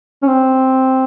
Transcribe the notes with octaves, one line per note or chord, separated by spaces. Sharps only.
C#4
C4